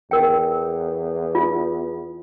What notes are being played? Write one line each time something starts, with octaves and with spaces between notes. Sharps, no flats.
E2 A#4 G5
F4